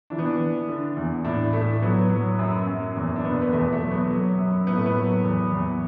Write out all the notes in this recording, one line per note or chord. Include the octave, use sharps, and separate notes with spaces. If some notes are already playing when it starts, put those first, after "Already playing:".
E3 D4
B3
D4
E3
D3
E2
A2 D4
A2 A3
F#3 B3
F#3
F#2
F#2
E2
D4
B2 B3
B3
E2 A3
A3
F#3
B3
F#3
F#2
A2 B3
A3
B3
F#3
E2
E2